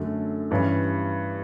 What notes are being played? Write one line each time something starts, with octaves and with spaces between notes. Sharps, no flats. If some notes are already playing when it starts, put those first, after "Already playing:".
Already playing: F#2 D3 F#3 A3 D4
G2 E3 G3 C#4